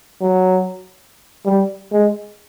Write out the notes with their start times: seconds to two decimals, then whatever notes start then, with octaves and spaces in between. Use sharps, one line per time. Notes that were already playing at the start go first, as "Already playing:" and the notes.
0.21 F#3
1.45 G3
1.92 G#3